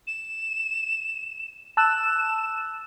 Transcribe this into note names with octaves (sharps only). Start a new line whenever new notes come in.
E7
A5 E6 F#6 E7